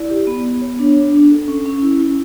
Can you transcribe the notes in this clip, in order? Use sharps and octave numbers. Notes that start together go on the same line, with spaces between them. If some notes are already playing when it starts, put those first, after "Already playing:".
Already playing: E4 D5
G4
B3
B3
C#5
D4
D4
D4
A4
C#4
C#4
E4
E4